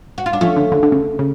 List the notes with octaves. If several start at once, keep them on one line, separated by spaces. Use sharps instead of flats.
F#4
F4
D4
F3 A3 C#4
D3
D3
D3
C#3
C#3